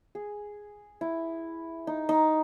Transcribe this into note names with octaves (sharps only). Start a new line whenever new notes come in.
G#4
E4
D#4
D#4